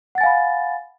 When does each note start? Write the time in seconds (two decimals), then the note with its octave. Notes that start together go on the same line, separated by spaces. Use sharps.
0.15 F#5
0.18 A6
0.21 G#5
0.23 F5
0.26 B5